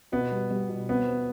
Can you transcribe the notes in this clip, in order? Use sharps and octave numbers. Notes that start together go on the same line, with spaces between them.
B2 B3
G3
G3
B2
B3 C4
C4